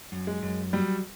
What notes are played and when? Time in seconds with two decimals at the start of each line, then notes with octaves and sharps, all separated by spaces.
0.12 F#2
0.27 G#3
0.43 F#2
0.73 F#3 G3